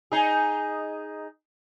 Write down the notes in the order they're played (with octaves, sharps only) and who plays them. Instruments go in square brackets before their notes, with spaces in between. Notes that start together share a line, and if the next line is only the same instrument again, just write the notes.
[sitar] D#4 G#4